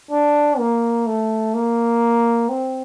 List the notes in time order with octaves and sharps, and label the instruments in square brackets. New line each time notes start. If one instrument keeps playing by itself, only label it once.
[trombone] D4
A#3
A3
A#3
C4